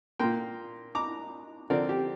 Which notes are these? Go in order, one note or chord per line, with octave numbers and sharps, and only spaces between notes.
A#2 A#3 G5 C6
A#5 D6
D3 F3 C4 A#4 D5
G4